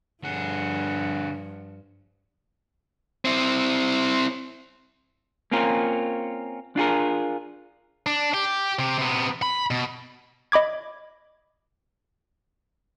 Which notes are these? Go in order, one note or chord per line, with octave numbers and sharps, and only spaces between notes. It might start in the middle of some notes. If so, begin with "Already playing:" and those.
G2 D3 F3 G#4 F#5
C4 E4
A#3 C4 C#4 F4 A#4
D4 F4 G#4 A#4
D4
G4
C3 G4
C3 B3
B5
B2
D#5 B5 D6 G#6